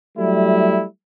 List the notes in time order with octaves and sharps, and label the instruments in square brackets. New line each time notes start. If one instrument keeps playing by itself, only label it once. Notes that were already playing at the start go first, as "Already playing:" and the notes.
[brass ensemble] F#3 G3 A3 E4